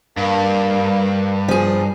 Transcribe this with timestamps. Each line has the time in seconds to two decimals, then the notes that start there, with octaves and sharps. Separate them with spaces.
0.18 G2 A#3
1.48 F3 G#4